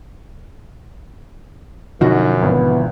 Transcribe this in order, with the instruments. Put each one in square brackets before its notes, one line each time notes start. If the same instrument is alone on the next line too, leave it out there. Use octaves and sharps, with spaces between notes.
[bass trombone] F#2 [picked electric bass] B2 D3 F3 [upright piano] D#4 F#4
[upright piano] G#1 [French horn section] E3 B3